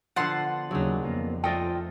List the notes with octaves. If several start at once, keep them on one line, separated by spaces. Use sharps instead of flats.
D3 F3 B3 F#5 A5 C6
D#2 C#3 F#3 D4 D#4
F2 A#3 B3
A3 F4 D5 D#5 G5